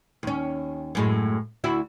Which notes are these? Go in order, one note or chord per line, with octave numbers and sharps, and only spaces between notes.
D#2 C#4
F#2 A2 G#3
D2 E4 F#4